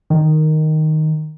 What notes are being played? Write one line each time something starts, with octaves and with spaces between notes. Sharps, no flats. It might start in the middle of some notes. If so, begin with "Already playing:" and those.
D#3